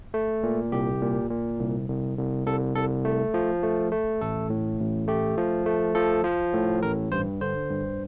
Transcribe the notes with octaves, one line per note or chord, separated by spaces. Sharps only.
A3
A#2
C2 G4
A#2
A#2
C2
C2
C2
C2 A4
C2 A4
A3
F3
A3
A3
A1 A4
A2
A1
A3 G4
F3
A3
F3 A4
F3
A2
A1 A#4
G2 C5
D3 C5
G2